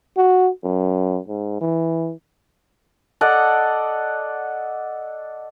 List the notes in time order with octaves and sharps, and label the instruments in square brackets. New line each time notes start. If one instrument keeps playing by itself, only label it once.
[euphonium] F#4
F#2
G#2
E3
[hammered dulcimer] A4 D5 D#5 F#5